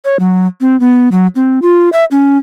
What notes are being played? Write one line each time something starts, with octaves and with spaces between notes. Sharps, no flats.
C#5
F#3
C4
B3
F#3
C4
F4
E5
C#4